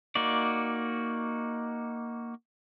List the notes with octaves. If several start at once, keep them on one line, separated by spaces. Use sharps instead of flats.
A#3 D#4 F#4 D5